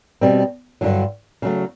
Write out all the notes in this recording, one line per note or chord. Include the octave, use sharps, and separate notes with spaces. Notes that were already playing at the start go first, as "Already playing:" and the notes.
B2 G3 C4
G2 D3 F#3
C#3 F#3 A3